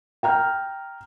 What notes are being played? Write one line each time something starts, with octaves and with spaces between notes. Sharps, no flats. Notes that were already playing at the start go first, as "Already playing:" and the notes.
G5 A#5 F6